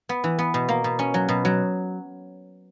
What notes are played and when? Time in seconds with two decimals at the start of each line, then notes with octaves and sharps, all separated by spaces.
0.09 B3
0.24 E3
0.39 B3
0.54 B2
0.69 A#3
0.84 B2
0.99 C#4
1.14 F#3
1.29 B2
1.45 F#3